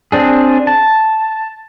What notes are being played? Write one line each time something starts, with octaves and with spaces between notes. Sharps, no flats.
C4 D4 G#4
A5